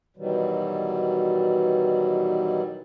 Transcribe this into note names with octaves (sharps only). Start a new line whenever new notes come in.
B2 D#3 E3 F#3 G3